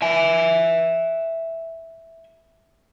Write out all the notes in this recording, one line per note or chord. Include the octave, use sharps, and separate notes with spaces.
E5 G#5